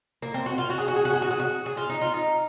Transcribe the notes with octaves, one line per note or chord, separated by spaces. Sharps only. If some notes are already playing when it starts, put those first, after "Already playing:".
A#3
C4
F#4
F4
F#4
G#4
F#4
G#4
F#4
G#4
F#4
G#4
F#4
G#4
F4
D#4
F4
D#4